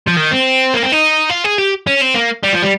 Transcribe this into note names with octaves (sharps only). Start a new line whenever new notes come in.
F3
D#3
C4
A#3
C4
D#4
F4
G#4
G4
C#4
C4
A#3
G3
F3
G3